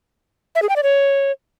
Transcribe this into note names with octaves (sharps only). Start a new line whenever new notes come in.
E5
G#4
G5
D5
C#5